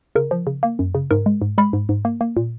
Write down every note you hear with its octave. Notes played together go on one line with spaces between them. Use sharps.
C#3 A#4
F3
C#3
A#3
F#2
C#3
G#2 A#4
G#3
G#2
G#3 B5
G#2
G#2
A#3
A#3
A#2